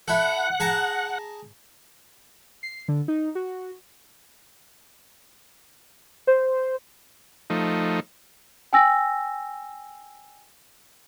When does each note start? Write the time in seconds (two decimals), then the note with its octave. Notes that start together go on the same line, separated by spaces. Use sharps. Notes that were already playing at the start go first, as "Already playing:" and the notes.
0.08 E4 A4 F#5
0.60 G#4 A5 A#5
2.63 C7
2.88 D3
3.08 D#4
3.35 F#4
6.27 C5
7.50 F3 A3 D#4
8.73 G5 G#5 E6 A#6